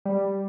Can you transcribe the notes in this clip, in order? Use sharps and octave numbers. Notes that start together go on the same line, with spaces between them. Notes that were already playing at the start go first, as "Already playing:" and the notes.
G3